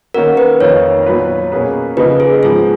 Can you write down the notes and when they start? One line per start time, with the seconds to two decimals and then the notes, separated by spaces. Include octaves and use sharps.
0.14 D#3 A#3 C#4 F#4 A#4
0.37 B4
0.60 F2 D#3 A#3 F4 C#5
1.06 A#2 F#3 B3 F4 B4
1.52 B2 A#3 C#4 G#4 B4
1.97 C#3 F3 A#3 D#4 B4
2.20 G#4
2.43 G#2 F3 B3 G#4